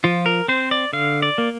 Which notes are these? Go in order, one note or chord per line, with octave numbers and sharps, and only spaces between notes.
F3 F4
A#4
C4 C5
D5
D3 F5
D5
A#3